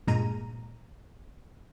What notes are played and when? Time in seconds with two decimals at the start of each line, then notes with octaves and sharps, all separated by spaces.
0.07 G2 A#2 G#3 A#5 D#7